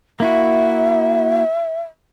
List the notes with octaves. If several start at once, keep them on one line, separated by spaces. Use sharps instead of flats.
A#3 E4 F#4 E5